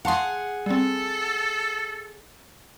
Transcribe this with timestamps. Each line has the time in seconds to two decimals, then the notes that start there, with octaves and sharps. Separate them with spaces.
0.05 G#4 F5 F#5 A5 C6
0.66 G3 C4 A4